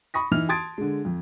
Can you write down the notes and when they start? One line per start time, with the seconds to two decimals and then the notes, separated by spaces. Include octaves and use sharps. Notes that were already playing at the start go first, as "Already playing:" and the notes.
0.14 B5 C#6 D#6 A#6
0.32 E3 D#4 F6 F7
0.49 A5 C6 D#6 G#6 A6 D7
0.78 D3 G#3
1.05 F2